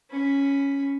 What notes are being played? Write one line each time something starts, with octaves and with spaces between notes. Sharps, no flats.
C#4 B5